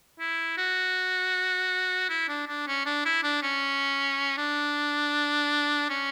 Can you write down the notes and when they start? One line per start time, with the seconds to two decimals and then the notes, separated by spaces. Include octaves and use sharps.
0.20 E4
0.58 F#4
2.09 E4
2.29 D4
2.48 D4
2.67 C#4
2.86 D4
3.06 E4
3.23 D4
3.43 C#4
4.37 D4
5.90 C#4